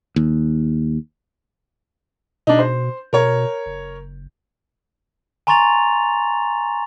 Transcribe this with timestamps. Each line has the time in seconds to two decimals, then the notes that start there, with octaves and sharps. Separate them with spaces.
0.16 D#2
2.47 B2 D4 D#4
2.59 C5
3.13 B2 A#4 C#5
3.66 F#1
5.47 G#5 A#5 C6 C#6 A6 F7